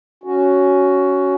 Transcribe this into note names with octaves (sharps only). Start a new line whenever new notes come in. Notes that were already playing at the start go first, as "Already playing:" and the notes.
C#4 F#4